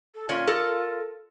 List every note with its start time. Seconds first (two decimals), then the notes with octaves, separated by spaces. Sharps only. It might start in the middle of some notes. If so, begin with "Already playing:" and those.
0.15 A4
0.29 A#2 C#4 F4
0.47 A4 A#4